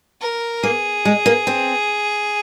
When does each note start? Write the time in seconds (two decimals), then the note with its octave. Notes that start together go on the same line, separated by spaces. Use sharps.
0.21 A#4
0.63 A#3 G#4
1.05 G#3
1.26 A#3
1.47 C4